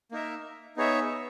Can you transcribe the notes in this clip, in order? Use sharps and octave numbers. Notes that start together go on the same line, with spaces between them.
A#3 D#4 A#4 E5
B3 D#4 G#4 C#5 E5